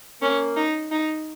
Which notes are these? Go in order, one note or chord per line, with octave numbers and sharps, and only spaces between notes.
A#3 C#4
D#4
D#4